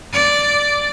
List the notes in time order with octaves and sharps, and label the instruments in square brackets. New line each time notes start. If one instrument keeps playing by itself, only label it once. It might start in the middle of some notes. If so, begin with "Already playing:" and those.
[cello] D5